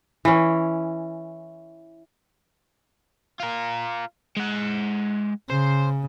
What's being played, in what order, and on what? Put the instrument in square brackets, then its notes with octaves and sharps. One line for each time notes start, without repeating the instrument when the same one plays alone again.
[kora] E3 C#4
[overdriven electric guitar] F4 A#4
G#3 F#5
[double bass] C#3 [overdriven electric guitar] C5